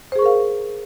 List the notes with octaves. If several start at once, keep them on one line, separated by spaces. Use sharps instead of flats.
G#4 A#4 C5 F5 C#6